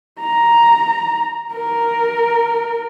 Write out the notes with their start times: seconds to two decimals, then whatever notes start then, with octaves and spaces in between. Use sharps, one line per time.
0.20 A#5
1.54 A#4